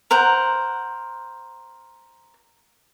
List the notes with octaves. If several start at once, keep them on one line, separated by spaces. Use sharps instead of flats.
A#4 C5 F#5